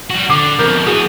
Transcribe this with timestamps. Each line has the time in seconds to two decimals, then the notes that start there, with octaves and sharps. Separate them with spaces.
0.10 G3 F#4
0.30 D3 D6 C7
0.59 F2 B2 A#4 G6
0.86 E3 B3 F#4 G#4